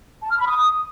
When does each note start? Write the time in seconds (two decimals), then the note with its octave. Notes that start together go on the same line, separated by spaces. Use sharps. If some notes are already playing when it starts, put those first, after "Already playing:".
0.23 A5
0.31 F6
0.39 B5
0.47 D#6